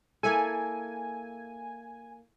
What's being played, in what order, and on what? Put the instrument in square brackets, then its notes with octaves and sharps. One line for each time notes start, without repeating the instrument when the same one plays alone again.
[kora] A#3 E4 A4 [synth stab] G#5